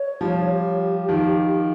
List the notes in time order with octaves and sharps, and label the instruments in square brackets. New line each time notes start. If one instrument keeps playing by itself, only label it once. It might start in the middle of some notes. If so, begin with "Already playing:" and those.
Already playing: [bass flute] C#5
[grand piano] F3 G3
[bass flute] G4
[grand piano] D#3 F3